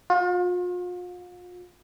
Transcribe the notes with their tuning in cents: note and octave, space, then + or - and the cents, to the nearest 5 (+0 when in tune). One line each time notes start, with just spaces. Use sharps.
F4 +40